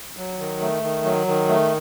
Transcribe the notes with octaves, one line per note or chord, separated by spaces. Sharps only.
F#3
D#3
A3
D#3
F#3
D#3
A3